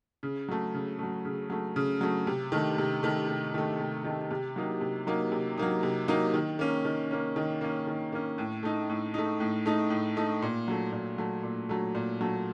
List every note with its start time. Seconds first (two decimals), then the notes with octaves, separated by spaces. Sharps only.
0.23 C#3
0.49 F#3 A3
0.74 C#3
0.99 F#3 A3
1.25 C#3
1.50 F#3 A3
1.76 C#3
2.01 F#3 A3
2.27 C3
2.52 D#3 A3
2.78 C3
3.03 D#3 A3
3.29 C3
3.54 D#3 A3
3.79 C3
4.04 D#3 A3
4.31 C3
4.56 F#3 A#3 D#4
4.81 C3
5.07 F#3 A#3 D#4
5.32 C3
5.58 F#3 A#3 D#4
5.83 C3
6.08 F#3 A#3 D#4
6.34 D#3
6.59 A#3 C#4
6.85 D#3
7.11 A#3 C#4
7.36 D#3
7.61 A#3 C#4
7.87 D#3
8.12 A#3 C#4
8.38 A2
8.63 A3 D#4
8.90 A2
9.14 A3 D#4
9.40 A2
9.66 A3 D#4
9.90 A2
10.17 A3 D#4
10.42 A#2
10.68 F#3 A3
10.92 A#2
11.18 F#3 A3
11.43 A#2
11.69 F#3 A3
11.95 A#2
12.21 F#3 A3